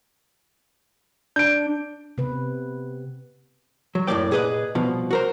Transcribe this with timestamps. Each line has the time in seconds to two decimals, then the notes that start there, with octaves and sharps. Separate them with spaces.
1.36 D4 G6 D7
2.18 C3 B3 B4
3.95 F#3
4.07 F#2 A2 A3 A#3 D5 G5
4.31 A#2 G#4 B4 D#5 E5 F#5
4.75 C2 B2 F3
5.11 F#4 A#4 C5